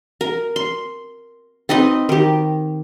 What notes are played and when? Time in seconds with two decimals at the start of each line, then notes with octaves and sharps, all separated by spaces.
0.21 A#4
0.56 C6
1.69 C4 D#4 B4 D#5
2.09 D#3 G4